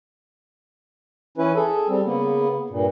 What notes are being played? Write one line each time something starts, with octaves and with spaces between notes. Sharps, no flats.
E3 C#4 E4 B4
G#4 A4
G3 C4
C#3 A#3 B3
G2 A#2